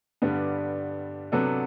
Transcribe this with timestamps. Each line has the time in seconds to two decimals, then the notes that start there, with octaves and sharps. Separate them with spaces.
0.22 G2 D3 G3 B3 D4
1.32 C3 F#3 B3 D4 A4